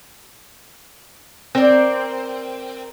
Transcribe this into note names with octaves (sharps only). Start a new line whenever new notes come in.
C4 A#4 D5